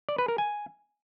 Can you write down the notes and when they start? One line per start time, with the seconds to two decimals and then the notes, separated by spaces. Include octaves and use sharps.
0.09 D5
0.18 B4
0.28 A#4
0.38 G#5